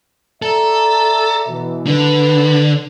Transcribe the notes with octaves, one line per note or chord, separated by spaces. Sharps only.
A4 D5 E5 A#5
B2 E3
D3 B4